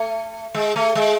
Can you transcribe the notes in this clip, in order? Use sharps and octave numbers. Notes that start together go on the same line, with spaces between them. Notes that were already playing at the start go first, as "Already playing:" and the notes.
Already playing: A3
G#3
A3
G#3